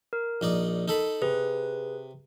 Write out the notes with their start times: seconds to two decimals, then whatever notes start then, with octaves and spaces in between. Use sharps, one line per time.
0.13 A#4
0.41 A#1 D#4 D5
0.88 D#4 A4 B5
1.22 C3 G#4 B4